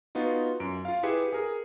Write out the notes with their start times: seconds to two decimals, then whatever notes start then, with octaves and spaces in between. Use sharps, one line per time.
0.15 B3 D#4 F4 F#4
0.60 F#2 D7
0.85 F4 F5
1.03 E4 G4 G#4 B4 E5 C#7
1.33 G#4 A#4